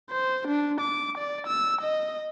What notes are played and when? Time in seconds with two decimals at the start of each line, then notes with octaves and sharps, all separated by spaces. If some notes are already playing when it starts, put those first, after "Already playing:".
0.10 C5
0.48 D4
0.81 D6
1.18 D5
1.47 E6
1.81 D#5